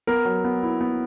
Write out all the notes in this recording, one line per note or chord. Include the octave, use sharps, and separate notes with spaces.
B3 A#4
F#3
B3
E4
B3